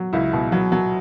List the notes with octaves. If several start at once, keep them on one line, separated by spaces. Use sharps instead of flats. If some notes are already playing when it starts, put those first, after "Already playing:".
Already playing: F#3
C#2 E4
B2
F#3
F#3